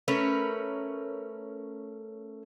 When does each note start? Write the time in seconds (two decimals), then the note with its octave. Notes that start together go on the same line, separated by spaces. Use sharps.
0.08 A3 C#4 A#4 B4